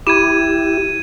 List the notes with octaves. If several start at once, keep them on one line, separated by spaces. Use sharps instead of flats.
E4 G4 G#6 D#7 E7